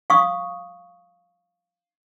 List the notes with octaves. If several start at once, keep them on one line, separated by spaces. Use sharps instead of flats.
F5 C#6 D#6